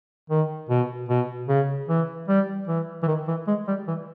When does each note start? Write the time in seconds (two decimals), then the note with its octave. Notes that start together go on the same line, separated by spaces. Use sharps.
0.30 D#3
0.70 B2
1.09 B2
1.48 C#3
1.89 E3
2.28 G3
2.68 E3
3.03 E3
3.08 D#3
3.28 E3
3.47 G#3
3.68 G3
3.88 E3